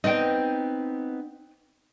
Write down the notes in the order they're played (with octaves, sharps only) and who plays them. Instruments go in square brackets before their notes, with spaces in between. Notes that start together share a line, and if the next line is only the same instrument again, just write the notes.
[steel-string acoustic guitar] B3 C4 D#4 [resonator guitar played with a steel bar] D#5 G5